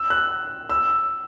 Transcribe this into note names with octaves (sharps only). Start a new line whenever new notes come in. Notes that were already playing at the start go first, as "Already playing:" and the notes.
Already playing: E6
F#6
E6